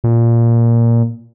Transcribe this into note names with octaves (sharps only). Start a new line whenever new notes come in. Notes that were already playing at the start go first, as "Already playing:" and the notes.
A#2